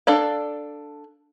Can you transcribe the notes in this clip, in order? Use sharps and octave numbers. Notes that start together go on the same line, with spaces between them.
D4 A4 D5 F5